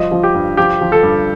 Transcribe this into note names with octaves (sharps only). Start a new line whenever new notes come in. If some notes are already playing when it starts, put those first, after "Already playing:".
Already playing: F3 G3 D#5
F3
G4
G2
F3 G4
F3
A4
G2